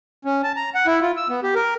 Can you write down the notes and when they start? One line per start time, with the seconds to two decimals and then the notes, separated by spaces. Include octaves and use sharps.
0.25 C#4
0.44 A5
0.57 A#5
0.75 F#5
0.87 E4
1.02 F4
1.17 E6
1.29 B3
1.43 G4
1.55 A#4